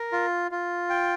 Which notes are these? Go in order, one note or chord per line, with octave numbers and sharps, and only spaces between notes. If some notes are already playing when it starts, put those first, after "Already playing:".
Already playing: A#4
F4
F4
G5